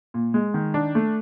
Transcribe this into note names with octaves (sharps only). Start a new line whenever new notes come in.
A#2
G#3
D#3
D4
A3